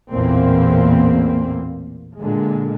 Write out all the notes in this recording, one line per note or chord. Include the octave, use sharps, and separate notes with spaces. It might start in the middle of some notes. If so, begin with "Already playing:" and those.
A1 E2 A#2 A#3 C4
A#2 D3 G#3